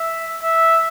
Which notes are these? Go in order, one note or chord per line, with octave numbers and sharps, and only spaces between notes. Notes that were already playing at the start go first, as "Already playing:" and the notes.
Already playing: E5
E5